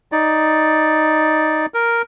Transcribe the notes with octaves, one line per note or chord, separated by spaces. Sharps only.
D#4 D5
A#4